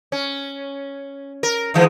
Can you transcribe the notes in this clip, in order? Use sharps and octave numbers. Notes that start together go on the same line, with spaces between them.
C#4
A#4
D#3 E3 G#3